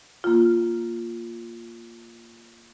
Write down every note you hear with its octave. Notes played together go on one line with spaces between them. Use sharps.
A#3 F4